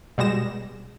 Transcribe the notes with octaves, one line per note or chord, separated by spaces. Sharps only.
B2 G3 G#3 A#6 E7